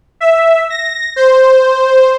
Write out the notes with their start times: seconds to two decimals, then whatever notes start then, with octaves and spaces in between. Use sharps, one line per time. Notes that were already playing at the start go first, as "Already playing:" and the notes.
0.20 E5
0.70 A#6
1.16 C5